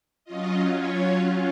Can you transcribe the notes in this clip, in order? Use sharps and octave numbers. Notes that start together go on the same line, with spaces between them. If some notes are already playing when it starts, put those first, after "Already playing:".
F#3 C#4 F4 D#5
C#5